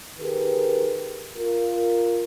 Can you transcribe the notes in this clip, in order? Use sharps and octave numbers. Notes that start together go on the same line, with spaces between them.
D#3 G4 G#4 A#4 B4
F4 A#4